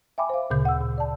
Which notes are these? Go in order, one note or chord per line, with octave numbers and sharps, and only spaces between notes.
E5 G5 G#5 B5 D6
C5 F5
D2 A#2 C#3 G6
F#5 E6
A#2
D5 A5